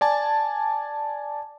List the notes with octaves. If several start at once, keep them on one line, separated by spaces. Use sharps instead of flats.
D5 G#5 A5